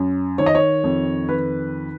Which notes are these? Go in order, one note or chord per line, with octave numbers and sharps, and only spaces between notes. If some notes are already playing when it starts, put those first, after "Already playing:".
Already playing: F#2
D#3 C#5
D#5
C#5
F2
D#3 B4